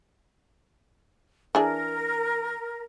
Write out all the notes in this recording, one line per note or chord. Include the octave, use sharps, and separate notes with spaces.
E3 D4 G#4 A#4